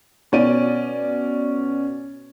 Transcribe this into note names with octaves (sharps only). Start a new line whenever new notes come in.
B2 C#4 D5 D#7